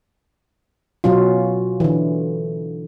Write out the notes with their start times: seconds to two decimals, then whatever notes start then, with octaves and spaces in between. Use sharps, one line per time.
1.04 B2 F#3 C#4 F4
1.80 D3 E3